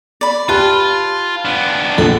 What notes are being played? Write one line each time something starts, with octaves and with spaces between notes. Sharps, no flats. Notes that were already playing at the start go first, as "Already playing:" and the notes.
D5 B5
F4 G4 B4 A5
B3 D4
A#1 A4